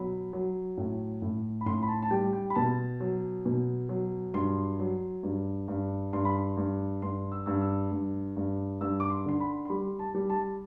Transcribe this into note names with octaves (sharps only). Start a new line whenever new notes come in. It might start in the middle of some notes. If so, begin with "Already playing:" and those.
Already playing: B2 F#3 B5
F#3
A2
A2
B5
A2 C6
B5
A5
A5
G3 G5
G5
B5
B2 A5
F#3
B2
F#3
G2 C6
F#3
G2
G2
G2 C6
B5
C6
G2
G2 C6
E6
G2 E6
E6
G2
G2
G2 E6
D6
C6
D3 C6
B5
C6
G3 B5
A5
G3
A5